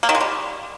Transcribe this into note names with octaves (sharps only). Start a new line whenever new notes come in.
A#3
D#3
G#3
G3